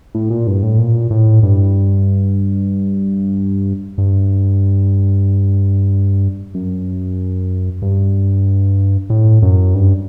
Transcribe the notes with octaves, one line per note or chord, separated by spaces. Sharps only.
A2
A#2
G2
A2
A#2
A2
G2
G2
F#2
G2
A2
F#2
G2